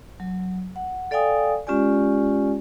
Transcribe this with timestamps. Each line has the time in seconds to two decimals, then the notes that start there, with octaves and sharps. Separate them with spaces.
0.20 F#3
0.76 F#5
1.11 A4 D5 F5 G5 G#5 D#6
1.67 G#3 C#4 F4 G4 D5 G#5